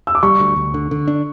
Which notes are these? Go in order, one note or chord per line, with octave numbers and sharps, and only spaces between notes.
E6
D6
G3 C#6
D2
D2
D3
D3
D4